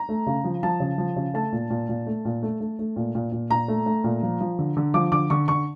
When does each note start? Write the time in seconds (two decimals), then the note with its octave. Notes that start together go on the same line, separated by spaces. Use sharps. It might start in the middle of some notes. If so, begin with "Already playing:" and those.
Already playing: A#5
0.09 A3
0.27 C#3
0.44 F3
0.63 F3 A5
0.80 C#3
0.98 F3
1.16 C#3
1.34 A3 A5
1.52 A#2
1.70 A#2
1.89 A#2
2.07 A3
2.25 A#2
2.43 A3
2.60 A3
2.79 A3
2.96 A#2
3.15 A#2
3.32 A#2
3.50 A#2 A#5
3.68 A3
3.86 A3
4.04 A#2
4.23 F3
4.41 F3
4.59 D3
4.77 D3
4.94 F3 D6
5.12 D3 D6
5.30 D3 C#6
5.48 D3 C#6